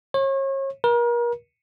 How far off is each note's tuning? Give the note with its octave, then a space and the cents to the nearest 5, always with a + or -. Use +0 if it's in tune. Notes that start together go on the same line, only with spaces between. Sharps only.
C#5 -35
A#4 +35